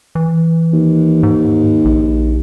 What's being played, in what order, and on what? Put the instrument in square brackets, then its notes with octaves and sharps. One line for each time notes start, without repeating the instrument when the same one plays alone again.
[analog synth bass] E3
[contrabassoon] D#2
[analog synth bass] G#2
A#1